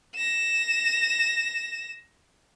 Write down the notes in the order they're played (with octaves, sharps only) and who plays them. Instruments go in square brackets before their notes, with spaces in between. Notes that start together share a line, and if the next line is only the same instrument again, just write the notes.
[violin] A#6 E7